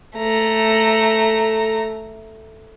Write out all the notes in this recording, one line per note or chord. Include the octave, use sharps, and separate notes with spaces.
A3 A#5